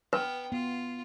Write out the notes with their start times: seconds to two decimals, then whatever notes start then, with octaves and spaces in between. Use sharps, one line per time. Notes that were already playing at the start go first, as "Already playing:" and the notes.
0.13 B3 B4 G5
0.52 B3 F4